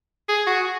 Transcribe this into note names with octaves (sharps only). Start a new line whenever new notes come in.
G#4
F#4